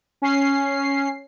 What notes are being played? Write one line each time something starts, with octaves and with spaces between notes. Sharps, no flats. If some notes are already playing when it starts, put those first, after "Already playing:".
C#4 C7